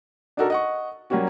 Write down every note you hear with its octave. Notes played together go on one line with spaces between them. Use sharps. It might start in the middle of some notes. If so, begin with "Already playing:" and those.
D4 D#4 F#4 A4 A#4
D#5 F#5 C#6
F#3 G3 A#3 C#4 F#4